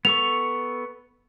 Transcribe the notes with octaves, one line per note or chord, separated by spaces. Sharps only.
B3 A4 C#6 F7